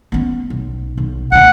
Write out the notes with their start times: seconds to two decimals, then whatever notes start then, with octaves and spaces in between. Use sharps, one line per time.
0.12 B3 C#4
0.50 B1
0.97 B1
1.32 D2 B2 F#5